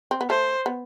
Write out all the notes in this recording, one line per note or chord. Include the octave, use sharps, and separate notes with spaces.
C4
B3
A3 C5
B3